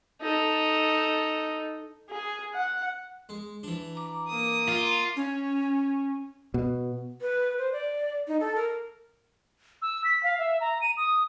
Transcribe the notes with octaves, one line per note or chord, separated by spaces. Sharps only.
D#4 A4
G#4
F#5
G#3
E3 D4
A#5 D6
A#3 D#6
F4
C#4
B2
B4
C5
D5
D#4
A4
A#4
E6
B6
F5
E5
A#5
D#7
D#6